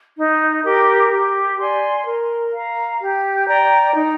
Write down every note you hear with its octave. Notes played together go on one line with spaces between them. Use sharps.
D#4
G4 A#4
G4
D5 G#5 C6
A#4
F5 A#5
G4
D5 G5 A#5
D#4